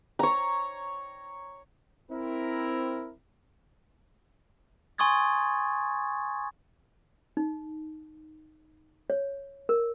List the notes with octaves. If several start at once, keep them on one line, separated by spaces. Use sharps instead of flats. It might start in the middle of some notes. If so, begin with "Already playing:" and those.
C#5 A#5
C4 E4 A#4
G#5 C6 C#6 D#6 G#6 A6
D#4
C#5
A#4